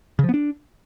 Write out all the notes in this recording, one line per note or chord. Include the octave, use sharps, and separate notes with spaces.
C#3
F3
B3
D4